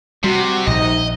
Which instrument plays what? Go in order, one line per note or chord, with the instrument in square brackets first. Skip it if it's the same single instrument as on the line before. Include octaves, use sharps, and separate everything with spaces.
[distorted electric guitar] C3 [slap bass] G3 [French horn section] F#4
[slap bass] A#1 [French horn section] C3 D#4 [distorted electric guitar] D#5